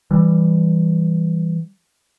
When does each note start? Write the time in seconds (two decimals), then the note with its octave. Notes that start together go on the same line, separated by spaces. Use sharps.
0.11 E3 G3